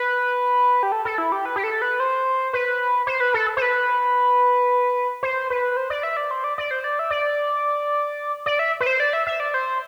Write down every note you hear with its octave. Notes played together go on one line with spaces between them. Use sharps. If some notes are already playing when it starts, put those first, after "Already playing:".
Already playing: B4
G4
A4
A4
E4
G4
B4
G4
A4
B4
C5
B4
C5
B4
A4
C5
B4
C5
B4
C5
D5
E5
D5
C5
D5
D5
C5
D5
E5
D5
D5
E5
B4
C5
D5
E5
E5
D5
C5